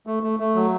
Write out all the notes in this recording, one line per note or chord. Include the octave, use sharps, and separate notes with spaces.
A3
A3
A3
F#3